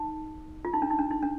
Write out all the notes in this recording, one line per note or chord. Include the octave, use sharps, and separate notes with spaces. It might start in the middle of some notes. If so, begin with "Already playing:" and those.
Already playing: D#4
F4
D#4
D4
D#4
D4
D#4
D4